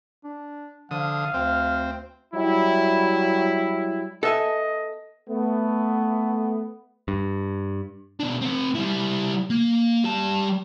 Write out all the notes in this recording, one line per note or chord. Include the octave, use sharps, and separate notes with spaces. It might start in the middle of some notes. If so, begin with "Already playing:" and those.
D4
D3 F3 F5 D#6
D2 C4
F#3 G3 E4
B3 A4 D#5 E5 G#5
A3 B3
G2
B2 D4
C4 F#5
G3 E4
A#3
G3 A5